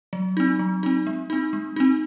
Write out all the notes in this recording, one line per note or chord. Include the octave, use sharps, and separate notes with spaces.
F#3
C4 D#4
F#3
C4 D#4
G#3
C4 D#4
G#3
C4 D#4